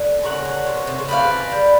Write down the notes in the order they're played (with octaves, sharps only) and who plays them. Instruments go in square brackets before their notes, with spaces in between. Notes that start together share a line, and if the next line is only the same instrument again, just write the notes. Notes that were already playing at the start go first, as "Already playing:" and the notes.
Already playing: [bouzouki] D3
[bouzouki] C#3 [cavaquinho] A#4 C#5 F#5
[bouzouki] D3
C3
B2
C3
C#3
[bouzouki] F3 [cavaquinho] B4 D5 F5
[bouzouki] G#3
G3